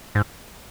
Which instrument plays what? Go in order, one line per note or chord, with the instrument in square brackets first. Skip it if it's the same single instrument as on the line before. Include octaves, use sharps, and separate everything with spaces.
[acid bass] G#2